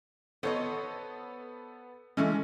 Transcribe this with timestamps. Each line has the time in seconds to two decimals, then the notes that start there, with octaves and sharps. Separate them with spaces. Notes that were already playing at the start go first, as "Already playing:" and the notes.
0.43 B3 A4 C5 C#5 D#5
2.17 E3 G#3 A3 C#4